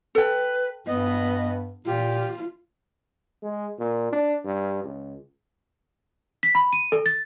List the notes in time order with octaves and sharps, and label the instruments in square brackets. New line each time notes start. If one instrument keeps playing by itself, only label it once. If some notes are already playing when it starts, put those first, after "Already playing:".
[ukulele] A4 G5 [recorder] B4
[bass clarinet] G2 [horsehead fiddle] B3 [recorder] D#5
[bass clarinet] A#2 [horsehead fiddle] F4 [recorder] G4
[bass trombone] G#3
A#2
D4
G2
C#2
[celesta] B6
B5
D#7
A4
A6